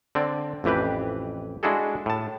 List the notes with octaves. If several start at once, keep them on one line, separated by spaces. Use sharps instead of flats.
D3 C4 D5
A1 F2 E3 G4 B4
G#3 D4 E4 F#4 G#4 A4
A2 A5